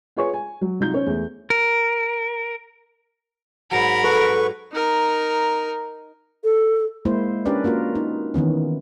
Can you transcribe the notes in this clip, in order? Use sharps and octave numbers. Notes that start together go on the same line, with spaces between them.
F4 G#4 B4 C#5 G#5 C#6
G#5
F#3
C2 F#3 D#4 F4 G6
C#4 C5 C#5
E2 A3
A#4
G#2 F#3 A#4 B5
A4 B4 C#6
D#4 A#4
A4
G#3 A#3 E4 C5
C#4 D4 G4 A#4 B4 D5
A#3 F4 F#4 A#4
D#4
D#3 E3 B3 C#4